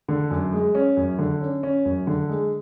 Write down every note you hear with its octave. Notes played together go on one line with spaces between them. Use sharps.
D3
F#2
G#3
C#4
F#2
D3
C#4
C#4
F#2
D3
G#3